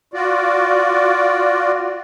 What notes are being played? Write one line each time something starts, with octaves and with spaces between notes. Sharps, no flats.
F4 F#4 D5